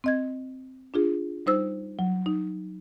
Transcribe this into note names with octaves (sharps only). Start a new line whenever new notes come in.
C4 D#5 G#6
D4 F4 G#4
G3 D#4 C5 E6
F#3
D#4